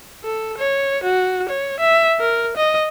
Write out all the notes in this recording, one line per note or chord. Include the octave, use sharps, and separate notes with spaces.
A4
C#5
F#4
C#5
E5
A#4
D#5